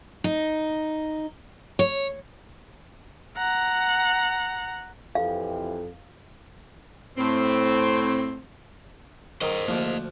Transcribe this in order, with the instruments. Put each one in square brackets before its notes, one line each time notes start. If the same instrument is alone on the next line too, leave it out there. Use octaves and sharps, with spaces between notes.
[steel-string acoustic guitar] D#4
C#5
[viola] F#5 A#5
[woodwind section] F2 [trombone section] E3 G4 [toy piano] F5
[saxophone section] A2 C4
[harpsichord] D#3 [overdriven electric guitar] C5 D#5
[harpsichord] D2 F3 [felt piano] A#3